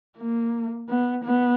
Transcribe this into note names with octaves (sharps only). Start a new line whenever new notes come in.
A#3
B3
B3